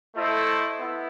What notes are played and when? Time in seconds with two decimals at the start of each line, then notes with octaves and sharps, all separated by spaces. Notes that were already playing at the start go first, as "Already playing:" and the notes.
0.14 A3 E4 A4 C5 D#5
0.79 B3 E4